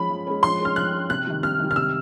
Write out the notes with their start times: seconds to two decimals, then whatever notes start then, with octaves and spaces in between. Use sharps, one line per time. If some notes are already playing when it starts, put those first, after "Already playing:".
Already playing: F3 G#3 C#4 B5
0.10 F3
0.27 G#3 C#4
0.43 F3 C6
0.60 G#3 C#4 F6
0.76 F3 F#6
0.93 G#3 C#4
1.09 C3 F#6
1.27 D#3 G3
1.43 C3 F6
1.60 D#3 G3
1.71 F6
1.76 C3 E6